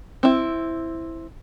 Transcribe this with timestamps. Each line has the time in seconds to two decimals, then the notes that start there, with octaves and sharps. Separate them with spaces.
0.23 C4 E4